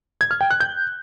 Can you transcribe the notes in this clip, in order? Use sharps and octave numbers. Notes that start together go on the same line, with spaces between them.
G#6
F6
G5
F#6
G6